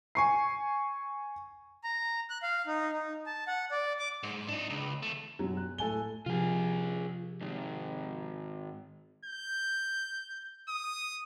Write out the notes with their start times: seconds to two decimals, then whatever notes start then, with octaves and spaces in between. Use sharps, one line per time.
0.15 G#5 C#6 C7
1.84 A#5
2.30 F#6
2.43 F5
2.67 D#4
2.92 D#4
3.26 A5
3.47 F#5
3.71 D5
3.99 D6
4.23 G#2
4.48 D4 D#4
4.70 C#2
5.02 D#2 A3
5.39 F#2 B2 F#3
5.57 F#6
5.78 A2 A4 G#5 G7
6.26 C3 F3 F4 G4 G#4
7.41 G#2 D#3
9.25 G6
10.69 D#6